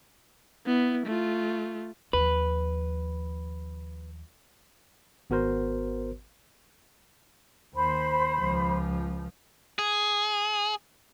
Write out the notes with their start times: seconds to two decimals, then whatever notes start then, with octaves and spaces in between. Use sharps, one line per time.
0.66 B3 E4
1.07 A3 F4
2.13 D#2 F3 B4
5.30 G#1 B3 F#4 A#4 C5
7.75 D#2 C5 B5
8.39 C#2 F3
9.79 G#4